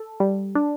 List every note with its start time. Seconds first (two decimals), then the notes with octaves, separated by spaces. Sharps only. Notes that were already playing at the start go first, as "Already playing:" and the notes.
Already playing: A4
0.20 G3
0.55 D4